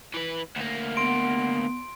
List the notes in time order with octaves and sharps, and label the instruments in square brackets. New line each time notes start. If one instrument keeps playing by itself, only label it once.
[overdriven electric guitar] E3 B4
D2 A#3
[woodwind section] B3 [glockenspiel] C6 D7